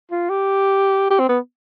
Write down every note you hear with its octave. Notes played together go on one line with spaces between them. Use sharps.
F4
G4
G4
C4
B3